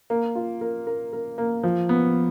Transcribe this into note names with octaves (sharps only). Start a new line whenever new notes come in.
A#3
F4
A#4
A#4
A#4
A#3
F3
B3